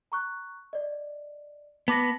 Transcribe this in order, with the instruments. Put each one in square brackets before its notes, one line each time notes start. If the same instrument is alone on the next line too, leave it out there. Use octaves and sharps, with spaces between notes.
[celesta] A#5 C#6 F#6
D5 D#5
[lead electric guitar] B3 [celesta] A5 D6 A#6